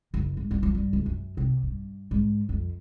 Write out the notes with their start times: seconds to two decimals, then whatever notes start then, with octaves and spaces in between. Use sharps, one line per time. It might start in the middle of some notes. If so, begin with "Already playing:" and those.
0.14 F#1
0.37 G#2
0.51 G2
0.63 F3
0.74 G2
0.93 C#2
1.06 F#2
1.37 C3
1.63 G2
2.11 G#2
2.49 F2